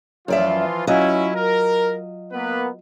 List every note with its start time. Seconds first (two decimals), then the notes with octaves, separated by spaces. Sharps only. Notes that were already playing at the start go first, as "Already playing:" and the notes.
0.28 F#2 E3 F3 F4 D5 E5
0.87 F#3 C#4 E4 F4 D#5
1.35 A#4
2.33 A#3 B3 B4